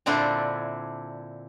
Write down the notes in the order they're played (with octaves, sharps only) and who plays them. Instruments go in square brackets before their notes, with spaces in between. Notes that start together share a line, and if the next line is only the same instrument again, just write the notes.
[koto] A#2 D3 C4 D4 E4